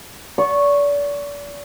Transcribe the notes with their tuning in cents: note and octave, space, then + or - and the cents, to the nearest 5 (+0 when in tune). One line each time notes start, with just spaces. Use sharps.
D5 -35 C#6 -5